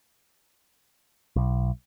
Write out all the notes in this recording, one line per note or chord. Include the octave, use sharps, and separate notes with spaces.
B1